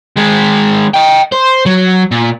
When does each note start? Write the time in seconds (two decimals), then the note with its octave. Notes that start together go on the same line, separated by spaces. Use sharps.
0.17 D#3 G#3
0.94 D#5 G5
1.32 C5
1.66 F#3
2.11 A#2